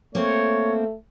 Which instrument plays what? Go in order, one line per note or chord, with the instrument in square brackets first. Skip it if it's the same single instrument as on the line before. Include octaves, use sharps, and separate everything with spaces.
[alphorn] A3 [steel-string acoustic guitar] A#3 C4 [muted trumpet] C#5